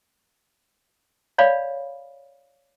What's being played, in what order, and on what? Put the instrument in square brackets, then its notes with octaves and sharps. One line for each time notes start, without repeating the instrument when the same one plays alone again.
[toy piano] C#5 D5 F5 B5